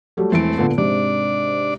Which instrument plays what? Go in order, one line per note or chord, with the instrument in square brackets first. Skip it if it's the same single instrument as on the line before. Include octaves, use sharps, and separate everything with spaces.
[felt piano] F#3 G3 A3
[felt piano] E1 E3 D7 [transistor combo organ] A3 C4
[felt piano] A#2 D3 B3
[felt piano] G#2 C3 [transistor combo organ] D4 D5